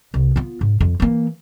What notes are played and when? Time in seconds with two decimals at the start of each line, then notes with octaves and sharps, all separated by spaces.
0.14 C2
0.36 B3 F4
0.61 G#2
0.80 F2
1.00 E3 A#3